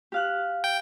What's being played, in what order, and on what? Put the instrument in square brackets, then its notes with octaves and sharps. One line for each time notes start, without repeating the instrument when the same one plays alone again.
[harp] G4 F5 F#6
[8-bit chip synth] G5